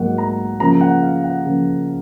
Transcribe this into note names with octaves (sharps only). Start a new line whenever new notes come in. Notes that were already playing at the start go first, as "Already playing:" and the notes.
Already playing: G#2 F#3 A#3 F#5
A#5
C#3 F3 A#3 A#5
F#5
F5
F#5
C#3 F3 A#3